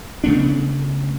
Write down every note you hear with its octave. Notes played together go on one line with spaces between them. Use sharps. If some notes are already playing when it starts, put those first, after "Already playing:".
C#3 A3 B3 D4